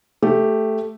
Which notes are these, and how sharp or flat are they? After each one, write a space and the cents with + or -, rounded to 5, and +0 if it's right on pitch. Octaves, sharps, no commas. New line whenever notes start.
A3 +0 G4 +0